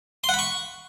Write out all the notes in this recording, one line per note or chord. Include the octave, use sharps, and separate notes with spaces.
C6
F#5
B5
C#6